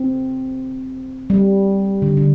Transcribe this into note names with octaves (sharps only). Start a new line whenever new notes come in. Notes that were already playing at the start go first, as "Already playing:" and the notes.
Already playing: C4
G3
D3
D3